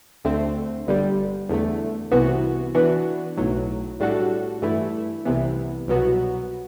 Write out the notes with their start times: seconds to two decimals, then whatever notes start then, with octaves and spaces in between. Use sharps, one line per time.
0.24 D2 D3 A3 C4
0.87 G1 G2 D3 G3
1.49 E2 D3 A3
2.11 C2 C3 E3 B3 F#4
2.75 E3 B3 D4 F#4
3.37 B1 A2 F#3
4.00 A2 G3 D4 F#4 A4
4.62 G2 E3 A3 E4
5.25 C2 C3 E3 B3
5.88 C2 B2 F#3 B3 F#4